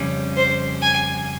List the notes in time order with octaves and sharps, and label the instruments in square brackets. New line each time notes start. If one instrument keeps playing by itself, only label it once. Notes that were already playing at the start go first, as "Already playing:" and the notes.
Already playing: [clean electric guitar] F2 C#3 G3 C#4
[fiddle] C5
G#5